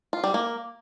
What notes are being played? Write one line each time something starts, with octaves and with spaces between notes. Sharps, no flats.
F4
G3
A#3